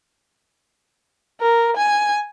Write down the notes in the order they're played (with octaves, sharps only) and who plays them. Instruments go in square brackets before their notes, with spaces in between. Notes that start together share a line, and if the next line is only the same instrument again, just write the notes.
[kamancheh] A#4
G#5